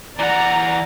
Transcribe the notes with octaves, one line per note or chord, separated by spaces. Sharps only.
E3 D5 F#5 A#5